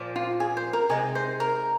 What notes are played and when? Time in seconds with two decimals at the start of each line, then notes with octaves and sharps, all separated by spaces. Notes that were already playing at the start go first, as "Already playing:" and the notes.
Already playing: A#2 F3 A#3
0.16 F4
0.40 G#4
0.57 C5
0.73 A#4
0.89 C3 G#3 D#4 G#4
1.15 C5
1.40 A#4